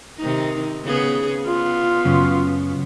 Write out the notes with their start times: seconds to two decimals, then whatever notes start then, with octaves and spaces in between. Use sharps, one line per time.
0.18 C3 D#3 D#4
0.84 C#3 B3 G#4
1.46 B3 F4
2.05 F#2 C#3